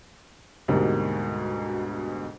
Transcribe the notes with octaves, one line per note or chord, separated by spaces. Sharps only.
D2 G#2 B2 G3 A#3